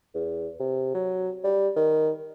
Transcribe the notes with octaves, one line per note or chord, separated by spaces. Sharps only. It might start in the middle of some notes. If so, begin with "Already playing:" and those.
E2
C3
F#3
G3
D#3